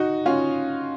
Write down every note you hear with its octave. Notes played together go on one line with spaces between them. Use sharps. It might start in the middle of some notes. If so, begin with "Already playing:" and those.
Already playing: D#4 F#4
C#4 F4